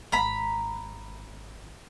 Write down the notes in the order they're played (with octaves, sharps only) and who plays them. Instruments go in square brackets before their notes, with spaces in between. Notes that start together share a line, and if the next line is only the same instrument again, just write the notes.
[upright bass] G#1 [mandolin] A#5 B5